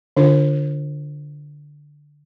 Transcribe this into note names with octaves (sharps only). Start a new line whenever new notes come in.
D3 D4 F4 A#4